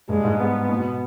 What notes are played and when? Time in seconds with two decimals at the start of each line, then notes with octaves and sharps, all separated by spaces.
0.09 G2 G#3
0.24 G#2
0.39 B3
0.69 B2